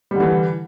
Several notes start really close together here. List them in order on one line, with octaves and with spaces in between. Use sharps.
G3 D3 E3